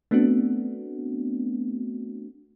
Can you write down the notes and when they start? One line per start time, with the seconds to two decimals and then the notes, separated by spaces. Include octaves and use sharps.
0.11 A3 B3 C4 D4 F#4